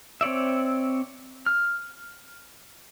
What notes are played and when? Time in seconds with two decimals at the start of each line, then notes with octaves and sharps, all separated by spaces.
0.21 C4 C#5 D5 E5
1.46 F6